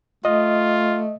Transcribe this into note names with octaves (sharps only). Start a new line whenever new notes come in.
A3 F4 D#5